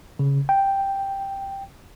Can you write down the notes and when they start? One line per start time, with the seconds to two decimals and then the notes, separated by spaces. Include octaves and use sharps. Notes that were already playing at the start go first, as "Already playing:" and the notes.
0.19 C#3
0.49 G5